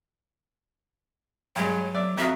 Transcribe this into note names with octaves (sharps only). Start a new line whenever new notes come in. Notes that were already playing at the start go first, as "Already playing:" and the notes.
G2 F#3 G#3
D5 E5
F2 F#3 E5 D#6